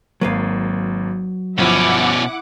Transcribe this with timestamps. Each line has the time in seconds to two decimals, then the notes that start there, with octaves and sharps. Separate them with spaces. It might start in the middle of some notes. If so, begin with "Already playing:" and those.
0.21 G#1 F#3 A#3 B4 F5
1.58 G1 B2 F3 C#4 E4 F#5 D6